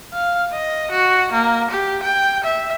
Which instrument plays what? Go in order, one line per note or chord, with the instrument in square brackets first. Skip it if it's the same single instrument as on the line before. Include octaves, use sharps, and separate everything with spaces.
[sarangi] F5
D#5
F#4
A#3
G4
G5
E5